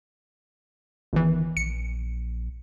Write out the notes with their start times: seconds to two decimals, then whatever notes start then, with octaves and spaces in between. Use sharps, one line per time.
1.13 G1 E2 D#3 E3
1.57 A#1 C#7